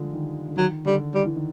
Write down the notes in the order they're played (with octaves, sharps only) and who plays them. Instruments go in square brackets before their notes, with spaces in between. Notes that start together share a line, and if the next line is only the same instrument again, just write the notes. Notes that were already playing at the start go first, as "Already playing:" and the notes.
Already playing: [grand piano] D3 F3 G3 G#3
D#3
D3
[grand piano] D#3 [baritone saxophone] F#3
[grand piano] D3 [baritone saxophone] G3
[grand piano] D#3 [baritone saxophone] G3
[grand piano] E3
D#3